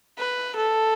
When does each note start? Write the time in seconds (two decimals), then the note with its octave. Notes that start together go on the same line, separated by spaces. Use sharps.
0.18 B4
0.56 A4